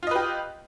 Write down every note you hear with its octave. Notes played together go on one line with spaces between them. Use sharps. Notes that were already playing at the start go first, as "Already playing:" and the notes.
F4 G4 B4 D#5